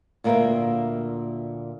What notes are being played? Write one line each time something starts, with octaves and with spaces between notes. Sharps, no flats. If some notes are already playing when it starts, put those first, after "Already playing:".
D2 A#2 A#3 A#4 B4 E5